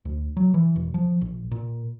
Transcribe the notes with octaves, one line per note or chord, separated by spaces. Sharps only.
D2
F#3
E3
E1
F3
A#1
A#2